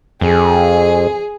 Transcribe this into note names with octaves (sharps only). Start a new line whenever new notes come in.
F2 G#4